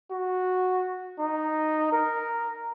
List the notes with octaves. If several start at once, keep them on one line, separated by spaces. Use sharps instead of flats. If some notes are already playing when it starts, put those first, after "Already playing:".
F#4
D#4
A#4